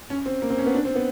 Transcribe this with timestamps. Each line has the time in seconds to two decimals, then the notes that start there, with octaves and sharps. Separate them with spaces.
0.10 C#4
0.26 C4
0.42 A#3
0.50 C4
0.58 C#4
0.66 B3
0.74 D4
0.85 C4
0.96 B3